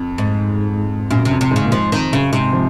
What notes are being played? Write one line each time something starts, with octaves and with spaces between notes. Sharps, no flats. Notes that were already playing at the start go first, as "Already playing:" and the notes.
Already playing: F2
G#2
F#2 A#2
C3
F2
C3
G#2 C#3
A#2
G#2 F3
F2 D#3
F#2 C#3
G#2 C3
F3